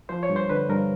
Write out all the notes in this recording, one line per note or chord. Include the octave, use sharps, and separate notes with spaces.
F3 C5
C#5
G2
C5
D3 B4
G2 A#4